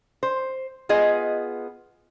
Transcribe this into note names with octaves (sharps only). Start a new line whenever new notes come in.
C5
B3 F4 G#4 D#5